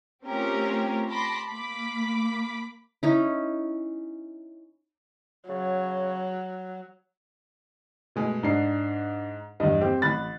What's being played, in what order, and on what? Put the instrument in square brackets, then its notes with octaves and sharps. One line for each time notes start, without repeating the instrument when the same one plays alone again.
[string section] A3 C4 C#4 F4 G4 A#4
A5 B5 C6 D6 A#6
A#3 B5 D6 B6
[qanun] C#4 D#4 E4
[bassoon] C#3 [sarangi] F#3
[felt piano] B2 G#3 A3
[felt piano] G#2 C7 [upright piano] D4
[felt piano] E2 G2 [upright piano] D#5
[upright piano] C4 [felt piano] G4
[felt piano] A1 B5 F#6 [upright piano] A6